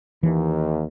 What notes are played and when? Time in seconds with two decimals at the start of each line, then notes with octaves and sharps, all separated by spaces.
0.23 D#2 E3